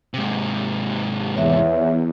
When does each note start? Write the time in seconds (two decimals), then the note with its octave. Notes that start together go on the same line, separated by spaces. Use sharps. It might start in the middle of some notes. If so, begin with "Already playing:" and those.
0.14 G#2 C3
1.36 E2 C#5 E5